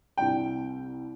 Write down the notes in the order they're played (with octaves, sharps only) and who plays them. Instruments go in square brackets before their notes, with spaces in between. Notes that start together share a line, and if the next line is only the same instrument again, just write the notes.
[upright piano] C2 C3 G3 D4 G5